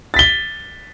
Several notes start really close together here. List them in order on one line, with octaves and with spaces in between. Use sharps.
A6 B6 G7